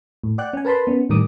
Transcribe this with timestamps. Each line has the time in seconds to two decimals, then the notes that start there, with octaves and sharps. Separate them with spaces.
0.24 A2
0.38 D5 F#5 G5 F#6
0.53 C#4 G#5
0.65 A#4 B4 A5 B5 C6
0.87 B3 C#4
1.09 A2 D#3 G3 A#4 D6 D#6